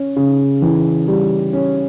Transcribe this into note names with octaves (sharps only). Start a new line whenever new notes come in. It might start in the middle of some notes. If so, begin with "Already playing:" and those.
Already playing: C#4
C#3
E3
G3
C#4